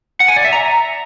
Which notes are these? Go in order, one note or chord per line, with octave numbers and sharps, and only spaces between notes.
F#5
G#5
D5
E5
A#5